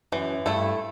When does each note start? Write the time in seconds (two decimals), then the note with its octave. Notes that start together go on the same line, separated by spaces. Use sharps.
0.12 F#2 E3
0.46 G2 A3 E4 A4